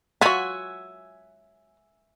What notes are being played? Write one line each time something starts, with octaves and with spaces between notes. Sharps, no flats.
F#3 F4 E5 F#5 G#5